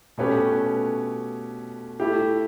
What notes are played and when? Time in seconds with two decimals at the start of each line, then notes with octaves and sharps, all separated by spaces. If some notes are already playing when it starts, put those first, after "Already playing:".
0.18 B2 A3 C#4 G4 B4
2.00 A3 E4 G4